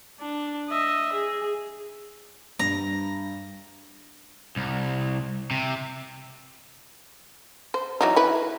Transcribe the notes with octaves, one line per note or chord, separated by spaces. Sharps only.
D4
D#5 E5
G#4
G2 A#5
C2
C3
C5
E3 F#3 D#4
E4 B4